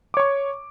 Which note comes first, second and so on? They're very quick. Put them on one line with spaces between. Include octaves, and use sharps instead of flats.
D6 C#5 C#6